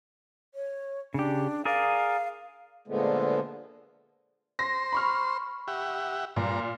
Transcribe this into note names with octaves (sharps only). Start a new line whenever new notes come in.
C#5
C#3 D4 G4
G#4 A#4 D5 F5
A#2 D3 F3 G#3 A3 B3
C5 C6 A#6
B5 C#6 F6
G4 E5 F#5
G2 A#2 A#5